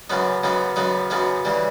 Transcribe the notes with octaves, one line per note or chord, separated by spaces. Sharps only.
F#2 C#3 F#3 B3 D#4
F#2 C#3 F#3 B3 D#4
F#2 C#3 F#3 B3 D#4
F#2 C#3 F#3 B3 D#4
C#3 E3 G3